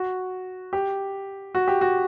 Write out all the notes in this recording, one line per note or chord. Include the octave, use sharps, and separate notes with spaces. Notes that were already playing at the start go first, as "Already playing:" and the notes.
Already playing: F#4
G4
F#4
G4
F#4